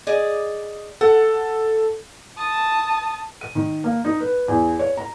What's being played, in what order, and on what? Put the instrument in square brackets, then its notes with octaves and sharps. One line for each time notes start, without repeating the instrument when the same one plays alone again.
[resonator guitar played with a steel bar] G#4 D5 D#5
[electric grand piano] A4 [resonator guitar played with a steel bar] F#5
[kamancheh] A5 D#6
[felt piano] D#7
D#3
A#3
D#4
B4
E2
C#5
A#5